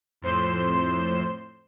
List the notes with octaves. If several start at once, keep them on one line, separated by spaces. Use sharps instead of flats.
F2 A2 C5 C6 E7